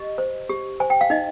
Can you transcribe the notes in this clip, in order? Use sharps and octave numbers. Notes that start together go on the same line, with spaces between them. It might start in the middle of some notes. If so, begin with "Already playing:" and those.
Already playing: G4 D#5
C5
G4
C5 G#5
G5
F5
D#4 D#5